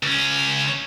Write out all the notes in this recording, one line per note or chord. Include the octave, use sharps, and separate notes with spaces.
C#2 C#4